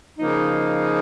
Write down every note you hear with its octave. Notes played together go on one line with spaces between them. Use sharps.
C#3 F3 A#3 D#4